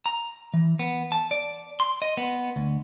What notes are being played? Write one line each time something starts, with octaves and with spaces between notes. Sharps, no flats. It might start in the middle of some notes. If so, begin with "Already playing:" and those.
A#5
E3
B3
A5
D5
C6
D#5
B3
D2